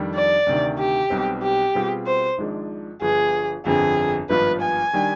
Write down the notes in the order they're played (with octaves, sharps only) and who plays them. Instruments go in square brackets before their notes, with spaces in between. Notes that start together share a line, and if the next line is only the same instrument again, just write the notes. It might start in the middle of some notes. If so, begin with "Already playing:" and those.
Already playing: [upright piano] F2 D#3 G3 D4
[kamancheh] D5
[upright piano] D2 C3 D#3
[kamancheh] G4
[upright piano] B1 B2 G3 C4
[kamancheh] G4
[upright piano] B2 G3 C4 F4 G#4
[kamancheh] C5
[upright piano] G#1 G#2 F3 G#3 D4
[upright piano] G1 G2 F3 B3 [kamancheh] G#4
[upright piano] G1 F2 D3 F3 C4 [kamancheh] G#4
[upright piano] G#1 G2 F3 B3 F4 [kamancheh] B4
[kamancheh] G#5
[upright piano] D#3 G3 D4 G4